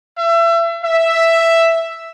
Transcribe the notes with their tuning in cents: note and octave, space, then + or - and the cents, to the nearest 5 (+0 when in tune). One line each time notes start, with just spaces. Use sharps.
E5 +30
E5 +5